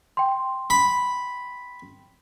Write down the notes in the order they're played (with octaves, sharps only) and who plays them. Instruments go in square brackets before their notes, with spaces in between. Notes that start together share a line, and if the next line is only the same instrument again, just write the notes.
[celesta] G5 C6
[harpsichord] B5